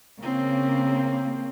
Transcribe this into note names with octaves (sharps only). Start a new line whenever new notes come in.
C#3 A#3 C4